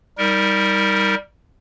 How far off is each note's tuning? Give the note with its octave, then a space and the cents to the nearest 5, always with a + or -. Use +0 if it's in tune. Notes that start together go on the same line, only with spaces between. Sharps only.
G3 +0 D#4 +25 A#4 +0